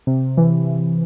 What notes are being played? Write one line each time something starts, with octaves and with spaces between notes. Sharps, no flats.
C3
E3